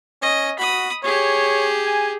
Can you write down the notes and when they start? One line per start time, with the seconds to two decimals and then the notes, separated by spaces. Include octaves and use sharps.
0.22 C#4 D#5
0.59 F#4 B5 D#6
1.03 G4 G#4 C#5
1.85 G#5